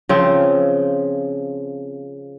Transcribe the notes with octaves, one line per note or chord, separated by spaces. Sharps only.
C#3 F3 C4